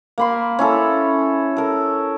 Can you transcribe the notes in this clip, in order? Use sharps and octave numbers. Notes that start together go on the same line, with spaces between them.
A#3 B5 C6
C#4 E4 A4
A4 A#4